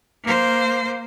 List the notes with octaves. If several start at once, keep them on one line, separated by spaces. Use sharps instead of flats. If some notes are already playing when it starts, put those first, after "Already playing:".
A#3 C5